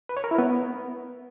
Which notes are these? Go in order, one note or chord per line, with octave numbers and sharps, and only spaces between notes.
B4
C#5
A#4
E4
B3